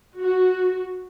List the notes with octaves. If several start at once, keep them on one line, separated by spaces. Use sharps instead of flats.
F#4